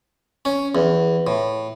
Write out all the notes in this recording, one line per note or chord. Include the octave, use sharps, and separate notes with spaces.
C#4
E2
A2